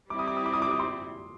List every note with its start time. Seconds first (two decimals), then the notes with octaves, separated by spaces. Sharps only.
0.10 G3 C4 E4 D6
0.19 D#6
0.27 D6
0.37 D#6
0.46 D6
0.53 D#6
0.62 D6
0.71 D#6
0.79 C6 D6